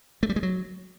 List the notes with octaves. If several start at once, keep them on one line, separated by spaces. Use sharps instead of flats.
A3
G3
G#3
F#3